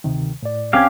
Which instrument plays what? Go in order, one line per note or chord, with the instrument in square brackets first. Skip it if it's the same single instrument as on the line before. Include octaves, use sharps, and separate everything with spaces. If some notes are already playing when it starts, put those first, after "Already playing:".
[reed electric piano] D2 C3 D#3
A2 D5
[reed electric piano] C2 C4 G#6 [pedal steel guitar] C#4 G4 F5